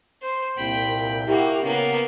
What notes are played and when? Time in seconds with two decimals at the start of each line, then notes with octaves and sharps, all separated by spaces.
0.21 C5
0.57 C2 A#2 G5 B5
1.27 A#3 E4 F#4 G4
1.63 C#3 A#3 B3 C#4